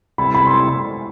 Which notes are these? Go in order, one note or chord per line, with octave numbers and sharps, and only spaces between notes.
C3 G3 C4 E4 A4 B5
B5
C6